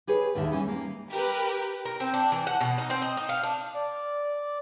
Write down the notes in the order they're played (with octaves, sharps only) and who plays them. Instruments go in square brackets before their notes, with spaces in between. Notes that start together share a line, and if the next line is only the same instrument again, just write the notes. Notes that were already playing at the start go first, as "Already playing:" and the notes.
[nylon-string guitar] G4 G#4 B4 C#5
D#2 D3 D#3 E5
E3 G3 C#4
A#3
[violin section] G4 A#4 B4
[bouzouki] A#4
C4
D4
E3
F#5
B2
D#4
C4
D#5
D#4
F5
D4
[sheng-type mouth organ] D5